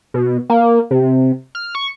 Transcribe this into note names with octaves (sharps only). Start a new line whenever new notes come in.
B2
A#3
C3
F6
C#6